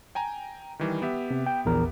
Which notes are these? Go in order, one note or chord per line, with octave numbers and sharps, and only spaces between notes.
G5 G#5 A#5
D#3 E3 G3
B3 G4 E5
C3
G5
A#1 E2 A#4